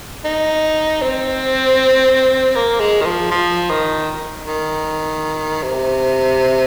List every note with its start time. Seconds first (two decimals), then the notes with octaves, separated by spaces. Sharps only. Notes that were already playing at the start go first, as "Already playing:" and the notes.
0.24 D#4
1.02 C4
2.55 A#3
2.80 G#3
3.01 D#3
3.06 F3
3.31 F3
3.70 D#3
4.47 D#3
5.62 C3